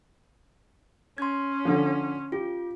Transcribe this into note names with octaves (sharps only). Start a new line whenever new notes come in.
C#4 C6 G#6
D3 F3
F4 G4